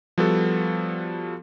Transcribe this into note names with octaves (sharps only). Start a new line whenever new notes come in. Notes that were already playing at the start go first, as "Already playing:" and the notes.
F3 G3 B3 F#4 A4